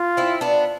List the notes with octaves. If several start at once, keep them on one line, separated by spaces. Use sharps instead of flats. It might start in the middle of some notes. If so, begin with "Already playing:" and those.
Already playing: F4
C4 E4
B3 D4